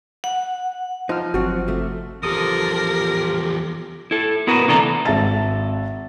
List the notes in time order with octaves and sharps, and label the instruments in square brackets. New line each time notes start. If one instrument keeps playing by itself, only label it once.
[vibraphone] F#5
[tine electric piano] F3 F6 [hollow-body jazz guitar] D#4 [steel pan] C5
[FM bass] G1 [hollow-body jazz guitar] F#3 C4 [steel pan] F#4
[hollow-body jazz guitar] C3 A3
[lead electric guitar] E2 A4 [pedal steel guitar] F3 D#6 [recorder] G4 [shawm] A#4
[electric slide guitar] E4 A4
B3 E4 F#4 A#4 B4
C3 E3 A3 D4 A4 A#5
[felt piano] G#1 E5 A5 A6